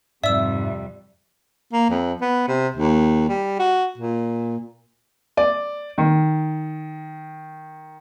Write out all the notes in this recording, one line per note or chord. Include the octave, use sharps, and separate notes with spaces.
F2 G#2 C3 G3 D5 E5 E6
A#3
F2
B3
C3
D#2
G3
F#4
A#2
D5
D#3